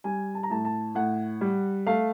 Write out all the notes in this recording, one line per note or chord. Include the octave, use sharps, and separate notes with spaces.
G3 G#5
A5
A#5
A2 A5
A5
A2 F#5
G3
A3 F5